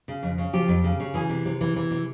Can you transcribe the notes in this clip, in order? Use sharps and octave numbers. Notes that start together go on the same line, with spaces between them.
C#3
F2
C#3
F3 G4
F2
C#3
C#3
E3 G#4
C3
C3
E3
E3
C3